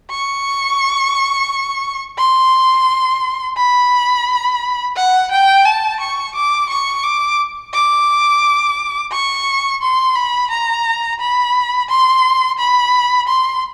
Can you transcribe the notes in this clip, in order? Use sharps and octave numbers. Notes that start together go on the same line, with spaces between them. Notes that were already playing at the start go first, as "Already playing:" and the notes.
C#6
C6
B5
F#5
G5
A5
C#6
D6
C#6
D6
D6
C#6
C6
B5
A#5
B5
C6
B5
C6